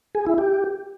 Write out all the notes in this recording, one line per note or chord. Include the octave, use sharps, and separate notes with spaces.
G#4
E4
G4